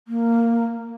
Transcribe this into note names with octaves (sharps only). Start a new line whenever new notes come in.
A#3